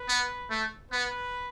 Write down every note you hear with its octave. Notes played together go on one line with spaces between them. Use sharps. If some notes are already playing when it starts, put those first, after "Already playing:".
Already playing: B4
B3
A3
B3 B4